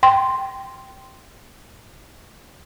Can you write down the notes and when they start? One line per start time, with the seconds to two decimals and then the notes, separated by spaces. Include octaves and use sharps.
0.03 G5 C6